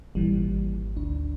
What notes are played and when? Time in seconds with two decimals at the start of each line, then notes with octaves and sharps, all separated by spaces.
0.15 G#1 A#2 E3 G3
0.97 D2 D4